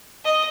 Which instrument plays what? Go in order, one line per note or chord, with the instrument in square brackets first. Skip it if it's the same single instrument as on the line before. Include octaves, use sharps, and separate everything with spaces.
[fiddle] D#5